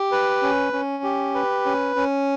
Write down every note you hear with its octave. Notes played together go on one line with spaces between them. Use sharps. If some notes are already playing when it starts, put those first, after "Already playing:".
Already playing: G4
B4
C#4
C#4
G4
B4
C#4
C#4